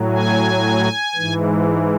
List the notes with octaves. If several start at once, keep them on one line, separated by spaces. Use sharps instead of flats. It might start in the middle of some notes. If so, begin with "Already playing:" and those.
Already playing: A2 F#3
G#5
G#2 E3